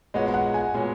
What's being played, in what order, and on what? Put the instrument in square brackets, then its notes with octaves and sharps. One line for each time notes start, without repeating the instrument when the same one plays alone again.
[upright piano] A#2 G#3 B3 F#4 C#5 [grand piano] D#5
[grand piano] F#5
G#5
[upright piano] A#2 G#3 B3 F#4 C#5